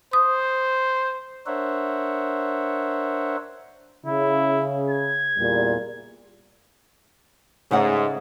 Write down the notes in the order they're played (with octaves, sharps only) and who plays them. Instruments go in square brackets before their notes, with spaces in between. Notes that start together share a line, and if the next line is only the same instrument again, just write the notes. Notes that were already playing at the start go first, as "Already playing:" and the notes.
[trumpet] C5 [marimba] D#6
[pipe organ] D4 A#4 C5 C#5 E5 F#5
[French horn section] C#3 [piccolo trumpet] E4
[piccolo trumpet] G#6
[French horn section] E2 A#2 G3
[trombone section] G#2 [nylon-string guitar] C#3 A3 F#5